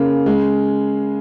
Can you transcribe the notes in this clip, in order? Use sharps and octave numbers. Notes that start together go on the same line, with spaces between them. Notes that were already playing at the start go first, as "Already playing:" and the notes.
Already playing: C#3 A#3
G#3